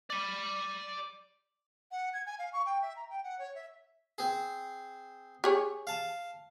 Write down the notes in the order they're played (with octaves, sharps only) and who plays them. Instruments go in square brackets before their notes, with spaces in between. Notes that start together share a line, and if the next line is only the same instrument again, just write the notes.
[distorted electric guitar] D5 B5 [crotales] D6 D#7
[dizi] F#5
G#6
G#5
F5
C#6
G5
E5
A#5
G5
F#5
C#5
E5
[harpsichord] C4 G#4
[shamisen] G4 G#4 C#5
[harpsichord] F5 A5